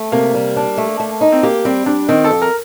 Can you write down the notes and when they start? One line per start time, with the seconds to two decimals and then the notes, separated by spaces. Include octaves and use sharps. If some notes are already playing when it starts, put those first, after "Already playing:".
Already playing: A3
0.12 C3 A#3
0.35 G3
0.56 D4
0.78 A3
1.00 A3
1.21 D#4
1.32 C4
1.43 A#3 G4
1.65 G3 C4
1.86 G3 D4
2.09 D#3 C4
2.24 A4
2.31 F2
2.42 A#4